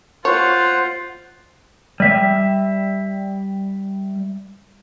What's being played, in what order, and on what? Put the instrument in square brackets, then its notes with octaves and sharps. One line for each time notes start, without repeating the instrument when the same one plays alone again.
[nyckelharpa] F4 [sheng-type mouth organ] C5 F#5 [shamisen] C#5
[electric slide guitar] G3 E5